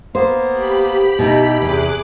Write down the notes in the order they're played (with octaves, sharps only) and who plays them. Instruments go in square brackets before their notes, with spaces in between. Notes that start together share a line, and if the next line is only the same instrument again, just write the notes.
[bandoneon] A#3 B3 [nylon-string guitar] C5
[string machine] G4 B5
[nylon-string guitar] B2 D#4 [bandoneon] E4 G5
[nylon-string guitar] E2 C3 [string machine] G#4 D6 F#6